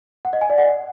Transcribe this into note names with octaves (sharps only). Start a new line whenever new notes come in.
F#5
D#5
G#5
D5
F#5